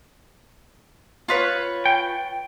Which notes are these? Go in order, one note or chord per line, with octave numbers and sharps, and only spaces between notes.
F4 B4 C#5
G5